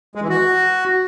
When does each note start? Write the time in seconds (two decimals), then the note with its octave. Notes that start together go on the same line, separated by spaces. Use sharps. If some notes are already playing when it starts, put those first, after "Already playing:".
0.15 G#3
0.22 E3
0.29 F#4